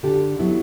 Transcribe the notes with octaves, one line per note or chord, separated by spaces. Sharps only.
D3 G4 A4
F#3 B3 E4